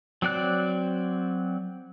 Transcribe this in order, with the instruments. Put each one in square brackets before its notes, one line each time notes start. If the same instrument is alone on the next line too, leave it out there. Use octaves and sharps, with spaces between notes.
[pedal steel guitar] F#3 C4 D5 F#6